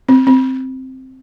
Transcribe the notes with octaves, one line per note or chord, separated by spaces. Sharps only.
C4
C4